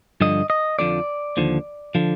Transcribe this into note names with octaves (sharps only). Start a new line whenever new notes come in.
G2 D3 F3 D#5
D#5
F2 D3 F3 D5
D#2 D3 F3
D3 F3